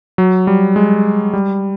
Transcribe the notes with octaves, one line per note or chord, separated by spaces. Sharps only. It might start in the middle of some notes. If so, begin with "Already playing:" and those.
F#3
G3
G#3
G3